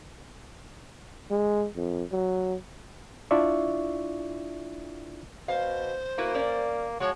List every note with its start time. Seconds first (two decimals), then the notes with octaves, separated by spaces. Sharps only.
1.31 G#3
1.76 F2
2.12 F#3
3.31 D4 E4 F4 D5 E5 C#6
5.48 B2 C5 F5
6.18 A#3 E4 F#4 B4
6.34 C#4 A#4 D5
7.00 F3 G#3 F#4 C#5